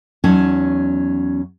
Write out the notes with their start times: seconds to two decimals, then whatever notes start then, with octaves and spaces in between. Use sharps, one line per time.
0.24 E2 F#3 C#4 D#4 A5